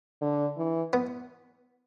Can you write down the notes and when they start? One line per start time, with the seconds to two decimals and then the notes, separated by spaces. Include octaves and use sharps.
0.21 D3
0.57 E3
0.93 B3